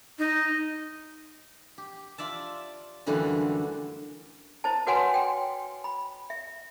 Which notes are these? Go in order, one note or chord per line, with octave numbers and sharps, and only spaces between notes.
D#4
G4
F4 D5 E5 A5
F#2 D3 E3 G3 A3 F4
E4 C5 A5
F#4 B4 C#5 F#5 G#5 C6
G5
B5
E5